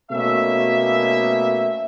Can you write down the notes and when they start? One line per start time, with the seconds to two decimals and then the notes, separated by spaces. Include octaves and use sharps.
0.11 B2 A3 A#3 C#4 E5